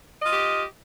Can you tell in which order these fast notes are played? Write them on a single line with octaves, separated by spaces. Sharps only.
D#5 F4 G4